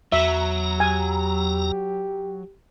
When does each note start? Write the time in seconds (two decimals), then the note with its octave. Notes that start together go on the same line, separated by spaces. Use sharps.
0.12 E2 F#3 E5 A#5
0.80 G4 G#5